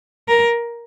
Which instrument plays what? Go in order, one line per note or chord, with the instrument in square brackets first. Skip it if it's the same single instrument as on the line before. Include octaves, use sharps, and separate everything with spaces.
[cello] A#4